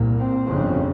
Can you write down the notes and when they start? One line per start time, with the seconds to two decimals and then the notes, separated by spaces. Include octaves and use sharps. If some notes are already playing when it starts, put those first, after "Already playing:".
Already playing: C2 A#2
0.19 C4
0.47 G1 F2 C#3